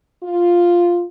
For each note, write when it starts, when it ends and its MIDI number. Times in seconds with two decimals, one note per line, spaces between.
0.23 1.03 65